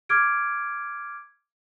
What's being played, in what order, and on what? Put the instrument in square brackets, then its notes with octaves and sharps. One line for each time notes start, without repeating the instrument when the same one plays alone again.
[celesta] D6 F6 G#6 D7